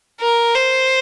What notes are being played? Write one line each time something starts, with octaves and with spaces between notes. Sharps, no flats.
A#4
C5